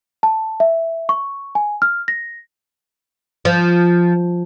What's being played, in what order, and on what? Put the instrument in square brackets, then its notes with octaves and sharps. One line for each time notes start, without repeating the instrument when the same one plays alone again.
[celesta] A5
E5
C#6
G#5
F6
A#6
[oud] F3